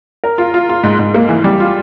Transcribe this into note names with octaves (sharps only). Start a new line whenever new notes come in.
A#4
F4
F4
F4
G#2
G#2
A#3
E3
G3
F4